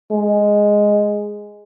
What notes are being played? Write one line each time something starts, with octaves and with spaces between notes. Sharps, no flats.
G#3